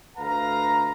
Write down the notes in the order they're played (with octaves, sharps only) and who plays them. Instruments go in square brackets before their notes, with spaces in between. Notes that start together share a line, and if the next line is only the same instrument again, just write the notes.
[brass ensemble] D2 B4 F5 A#5